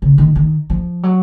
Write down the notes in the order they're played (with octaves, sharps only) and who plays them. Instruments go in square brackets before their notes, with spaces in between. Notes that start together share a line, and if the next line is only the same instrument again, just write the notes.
[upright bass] C#3
D#3
D#3
F3
F#3